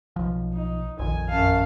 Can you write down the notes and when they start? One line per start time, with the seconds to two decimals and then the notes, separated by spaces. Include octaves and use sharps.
0.16 B1 F3
0.53 D#4
0.99 A#1 F2 D#3 G#5
1.29 F#2 F5 A5